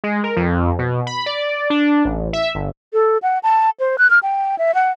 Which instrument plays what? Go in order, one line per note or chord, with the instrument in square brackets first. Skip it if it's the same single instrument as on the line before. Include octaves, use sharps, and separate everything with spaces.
[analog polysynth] G#3
A#4
F2
B2
B5
D5
D4
A1
E5
G1
[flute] A4
F#5
A5
C5
F#6
F6
G5
E5
F#5